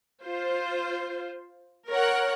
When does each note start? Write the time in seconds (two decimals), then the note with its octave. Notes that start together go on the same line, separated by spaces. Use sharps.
0.24 F4 C5
1.89 A#4 C#5 F#5